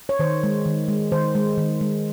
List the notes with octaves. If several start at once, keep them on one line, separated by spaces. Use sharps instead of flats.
C#5
D#3 C5
G#3
D#3
G#3
D#3 C5
G#3
D#3
G#3